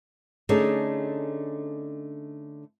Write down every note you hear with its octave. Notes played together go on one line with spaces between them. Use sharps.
D3 A3 C#4 D#4 G#4 A4